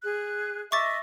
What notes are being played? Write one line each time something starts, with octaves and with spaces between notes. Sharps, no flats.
G#4 F#6
D#5 E5 C#6 D6 A6